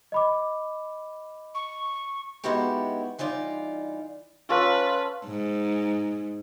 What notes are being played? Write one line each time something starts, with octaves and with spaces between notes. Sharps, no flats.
D#5 B5 D6
C#6
G#3 B3 D#4 E4 F#4 G4
G2 E3 D#4 F4 D5
C#4 F4 A4 B4
G#2